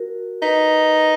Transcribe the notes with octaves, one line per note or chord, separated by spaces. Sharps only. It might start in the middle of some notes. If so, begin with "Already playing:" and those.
Already playing: F#4 A#4
D#4 B4